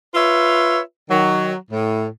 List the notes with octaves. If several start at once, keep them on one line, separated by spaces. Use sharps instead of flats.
F4 B4 C#5 E5
D#3 F#3
A2